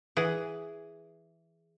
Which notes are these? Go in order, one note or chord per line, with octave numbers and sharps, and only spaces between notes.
E3 G#4 F#5